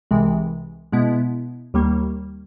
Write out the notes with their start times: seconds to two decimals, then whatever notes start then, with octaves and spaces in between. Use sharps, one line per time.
0.11 C2 C3 E3 G#3
0.92 B2 G#3 B3 E4
1.74 D#2 D#3 G3 A#3